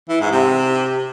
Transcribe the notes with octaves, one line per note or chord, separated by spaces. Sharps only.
E3
G#2
C3